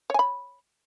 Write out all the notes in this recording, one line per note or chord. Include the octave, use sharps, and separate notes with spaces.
C#5 G#5 B5